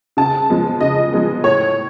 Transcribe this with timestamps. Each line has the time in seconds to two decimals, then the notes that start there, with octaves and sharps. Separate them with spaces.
0.17 C#3 A5
0.49 F3 G#3 B3
0.80 C#3 D#5
1.12 F3 G#3 B3
1.43 A2 C#5